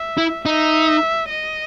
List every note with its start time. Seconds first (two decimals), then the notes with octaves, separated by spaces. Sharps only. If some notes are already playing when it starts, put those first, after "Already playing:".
Already playing: E5
0.18 E4
0.45 D#4 E5
1.29 D#5